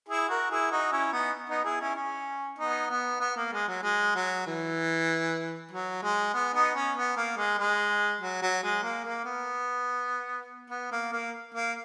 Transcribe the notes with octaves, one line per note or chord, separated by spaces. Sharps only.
E4 G#4
F#4 A#4
E4 G#4
D#4 F#4
C#4 E4
B3 D#4
B3 D#4
E4 G#4
C#4 E4
C#4
B3 D#4
B3
B3
A#3
G#3
F#3
G#3
F#3
E3
F#3
G#3
B3
B3 D#4
C#4
B3
A#3
G#3
G#3
F#3
F#3
G#3
A#3
A#3
B3
B3
A#3
A#3
A#3